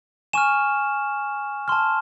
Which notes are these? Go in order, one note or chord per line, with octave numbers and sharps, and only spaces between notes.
G#5 C#6 F6 E7
A5 C6 F6